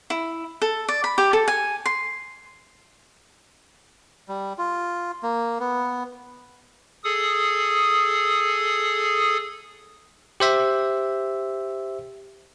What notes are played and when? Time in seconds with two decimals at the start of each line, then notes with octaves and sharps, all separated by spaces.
0.10 E4
0.62 A4
0.89 D5
1.04 B5
1.18 G4
1.33 A4
1.48 G#5
1.86 C6
4.28 G3
4.58 F4
5.23 A#3
5.60 B3
7.04 G#4 A4 D#6
10.40 G4 C5 E5